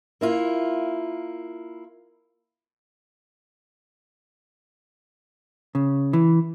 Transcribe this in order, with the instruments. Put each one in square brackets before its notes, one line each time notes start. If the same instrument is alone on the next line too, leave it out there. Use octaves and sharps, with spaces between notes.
[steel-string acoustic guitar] A#3 E4 F4
[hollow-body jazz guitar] C#3
E3